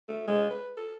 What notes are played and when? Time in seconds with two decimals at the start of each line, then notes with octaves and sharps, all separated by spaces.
0.08 A3
0.27 G#3
0.50 B4
0.77 A4